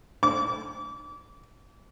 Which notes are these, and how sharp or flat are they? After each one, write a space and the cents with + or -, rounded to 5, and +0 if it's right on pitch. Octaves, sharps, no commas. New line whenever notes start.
D6 -30